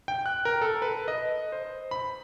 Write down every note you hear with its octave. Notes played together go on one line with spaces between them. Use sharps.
G5
F#6
A#4
A4
B4
D#5
C5
B5